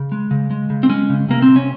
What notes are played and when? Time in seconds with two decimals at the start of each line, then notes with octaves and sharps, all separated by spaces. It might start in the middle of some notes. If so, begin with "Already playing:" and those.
Already playing: C#3
0.12 G#3
0.31 C#3
0.51 G#3
0.70 C#3
0.83 C4
0.90 G#3 C#4
1.10 C#3
1.28 C3 A#3
1.42 C4
1.48 C3
1.56 C#4